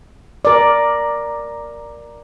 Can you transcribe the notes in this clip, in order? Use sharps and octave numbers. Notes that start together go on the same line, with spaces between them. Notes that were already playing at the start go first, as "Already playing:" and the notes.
A#4 D5